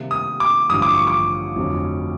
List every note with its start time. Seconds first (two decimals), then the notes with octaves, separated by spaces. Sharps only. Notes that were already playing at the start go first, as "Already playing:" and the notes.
Already playing: C3 D#3 G3 A#3
0.11 D#6
0.40 D6
0.69 A1 G2 D3 F3 D#6
0.82 D6
0.95 C#6
1.07 D6
1.56 F1 F2 D3 F#3